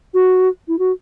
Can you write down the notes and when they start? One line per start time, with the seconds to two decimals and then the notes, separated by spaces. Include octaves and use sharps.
0.14 F#4
0.68 E4
0.79 F#4